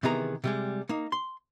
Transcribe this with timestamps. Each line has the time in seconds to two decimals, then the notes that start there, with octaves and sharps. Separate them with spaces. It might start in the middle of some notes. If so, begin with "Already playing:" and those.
0.03 C3 D#3 E3 B3 G#4 A#5
0.44 C3 G3 G#3
0.89 A#3 D#4
1.12 C6